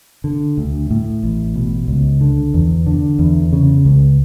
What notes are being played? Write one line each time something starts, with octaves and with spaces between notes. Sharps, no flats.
D3
D2
A2
A1
B2
C#2
D3
E2
D3
E2
C#3
C#2